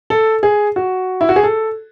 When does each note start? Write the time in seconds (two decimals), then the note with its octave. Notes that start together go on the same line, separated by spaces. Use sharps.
0.10 A4
0.43 G#4
0.76 F#4
1.21 E4
1.29 F#4
1.36 G#4
1.43 A4